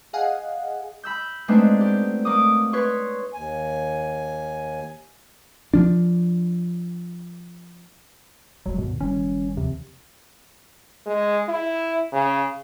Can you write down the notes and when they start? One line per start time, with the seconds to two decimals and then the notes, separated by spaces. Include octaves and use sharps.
0.13 G#4 D#5 F5 F#5 G#5
1.03 B5 E6 G6
1.48 G#3 A3 B3 C4 D4 D#4
1.81 G4
2.25 A#3 D6 D#6
2.73 B4 C#5 C6 C#6
3.34 D#2 G#5
5.74 F3 D4
8.66 D#1 A#1 F#3 G#3
8.78 D2 G2 B2 D#3
9.01 F#1 D#3 G3 C#4
9.57 D#2 C3 F3
11.06 G#3
11.49 E4
12.13 C#3